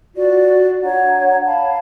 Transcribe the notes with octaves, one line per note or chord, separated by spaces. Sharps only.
F4 F#4 D5
D4 C#5 F#5 A#5
F5 A5 B5